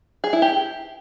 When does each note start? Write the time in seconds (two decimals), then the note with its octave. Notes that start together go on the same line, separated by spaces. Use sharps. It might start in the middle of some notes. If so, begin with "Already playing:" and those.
0.24 G#4
0.33 E4
0.42 G4